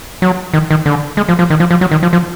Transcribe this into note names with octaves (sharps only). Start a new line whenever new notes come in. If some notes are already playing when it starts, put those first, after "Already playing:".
F#3
D#3
D#3
D3
G#3
F3
F3
D#3
F3
F3
F#3
D#3
F3
F3